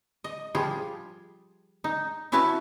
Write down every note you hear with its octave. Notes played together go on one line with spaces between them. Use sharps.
D#5
F3 G3 F4 G#4
D#4
C#4 E4 F#4 B4 E5 A5